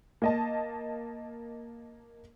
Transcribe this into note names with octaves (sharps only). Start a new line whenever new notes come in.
A#3 D#5 A5